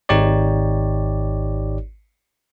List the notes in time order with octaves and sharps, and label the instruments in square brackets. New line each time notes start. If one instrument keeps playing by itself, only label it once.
[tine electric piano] G#1 D#4 G4 C#5 D5